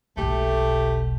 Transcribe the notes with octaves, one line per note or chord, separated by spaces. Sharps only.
E1 B1 A3 G4